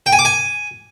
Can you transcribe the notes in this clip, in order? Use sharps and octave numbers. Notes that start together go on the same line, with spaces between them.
G5
G#5
D6
G#5